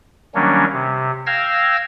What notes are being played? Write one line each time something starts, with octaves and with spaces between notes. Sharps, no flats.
D#3 F#3 G3 A#3 C#4 D4
C3
F5 G5 E6 F6 G#6 A#6